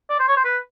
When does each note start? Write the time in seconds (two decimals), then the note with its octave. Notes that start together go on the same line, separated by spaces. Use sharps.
0.10 D5
0.19 C5
0.28 C#5
0.37 C5
0.45 B4